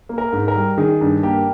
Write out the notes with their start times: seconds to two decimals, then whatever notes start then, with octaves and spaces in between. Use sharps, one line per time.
0.09 A#3
0.18 A#4
0.32 G#2
0.48 A#4
0.55 G3
0.78 D#3 G#4
1.01 G2
1.23 A#3 G4